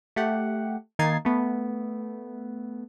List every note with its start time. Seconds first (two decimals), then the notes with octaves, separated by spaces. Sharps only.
0.16 A3 G4 F#5
0.99 D#3 A#3 D#4 G#6 A6 C7
1.25 A3 B3